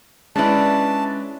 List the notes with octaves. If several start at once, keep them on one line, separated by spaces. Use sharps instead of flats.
G#3 C#4 D4 E4 B4 A5